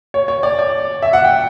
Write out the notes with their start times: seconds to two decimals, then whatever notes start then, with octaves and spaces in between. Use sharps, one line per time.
0.14 C#5
0.28 C#5
0.43 D5
0.59 D5
1.02 E5
1.13 F#5
1.24 G5